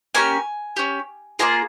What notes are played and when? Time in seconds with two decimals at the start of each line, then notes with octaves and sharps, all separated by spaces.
0.15 A#3 C#4 G4 G#5
0.76 C#4 G4
1.39 A#3 F4 G#4 A#5